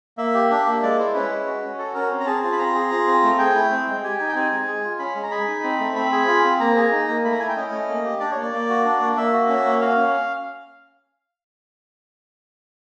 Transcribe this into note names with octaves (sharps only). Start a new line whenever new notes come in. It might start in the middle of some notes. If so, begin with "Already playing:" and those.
A#3 E5
G4
D4
A#3
G#3 D5
E4 C5
C#4 B4
G#3
F#4
C#4
F#4 A4
C#4 A#4
C4
A#5
G#4 A5
F4 A5
B5
C4 A#5
G#4
F4
C4
A3
G#4 G5
E4
C4
G#3
G4 G#5
D#4 G#5
G5
C4 G#5
G#3
G#4
F4
C#4 B5
G#3
A#5
G#4 B5
D#4
C4
A3
C4 B5
G#4
F4
C4
A#3 A#5
G#4
D#4
A#3
A3 B5
A#5
E4 G#5
G5
C#4 D#5
A3
A#3
G4
D4 D5
A#3 C#5
D5
A#3
F#4
D4
A#3
A#3 E5
F#4
C#4
A#3
F#4 F5
C#4